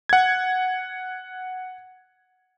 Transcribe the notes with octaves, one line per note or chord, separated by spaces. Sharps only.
F#5 G#6